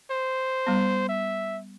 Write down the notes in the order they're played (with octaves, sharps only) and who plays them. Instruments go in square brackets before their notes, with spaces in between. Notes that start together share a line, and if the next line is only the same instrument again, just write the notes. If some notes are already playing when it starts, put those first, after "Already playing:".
[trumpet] C5
[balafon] G3 B3
[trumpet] E5